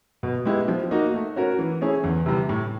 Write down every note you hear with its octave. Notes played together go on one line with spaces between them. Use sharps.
B2
G#3 B3 E4 G4
F3
A#3 D#4 F#4
A3
C#4 F#4 A#4
E3
A3 C#4 E4 G#4
E2
C3 E3 G3
A2